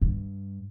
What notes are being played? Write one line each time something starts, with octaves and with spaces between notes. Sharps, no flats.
G2